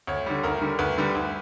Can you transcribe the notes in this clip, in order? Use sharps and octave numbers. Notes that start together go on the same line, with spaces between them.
D2 C#5
D3 G3
D2 A#4
D3 G3
D2 B4
D3 G3
D2